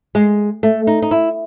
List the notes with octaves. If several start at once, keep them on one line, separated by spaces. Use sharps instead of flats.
G#3
A3
D#4
D#4
E4